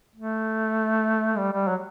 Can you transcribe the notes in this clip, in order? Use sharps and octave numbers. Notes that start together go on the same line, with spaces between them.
A3
G3
G3
F#3